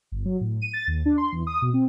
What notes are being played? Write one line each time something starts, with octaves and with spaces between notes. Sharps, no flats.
G1
F#3
A2
D#7
A6
D#2
D4
C6
E2
D#6
B2
C4